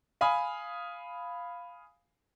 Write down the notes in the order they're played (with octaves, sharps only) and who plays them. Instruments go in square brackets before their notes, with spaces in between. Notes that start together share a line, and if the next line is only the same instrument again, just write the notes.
[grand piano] F5 G#5 B5 D#6